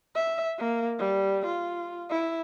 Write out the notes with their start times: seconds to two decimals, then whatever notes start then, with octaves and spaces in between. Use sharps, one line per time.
0.15 E5
0.59 A#3
0.99 G3
1.46 F4
2.10 E4